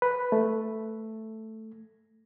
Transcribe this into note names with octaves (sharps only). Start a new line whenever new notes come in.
B4
A3